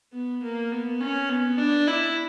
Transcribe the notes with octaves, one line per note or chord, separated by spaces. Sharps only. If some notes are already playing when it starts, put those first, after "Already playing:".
B3
A#3
B3
C#4
B3
D4
E4